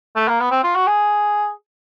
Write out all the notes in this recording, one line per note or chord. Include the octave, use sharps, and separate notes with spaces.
A3
A#3
B3
C4
F4
F#4
G#4